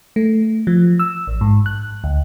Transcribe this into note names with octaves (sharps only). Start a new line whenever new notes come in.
A3
F3
E6
A1
G#2
F#6
D2